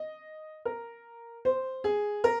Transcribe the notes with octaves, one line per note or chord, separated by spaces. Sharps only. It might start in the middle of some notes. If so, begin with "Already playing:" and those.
Already playing: D#5
A#4
C5
G#4
A#4